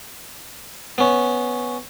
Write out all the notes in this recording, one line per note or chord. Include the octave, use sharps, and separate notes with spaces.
B3 C#4